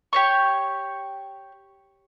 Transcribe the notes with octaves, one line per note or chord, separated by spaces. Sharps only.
G4 C#5 C#6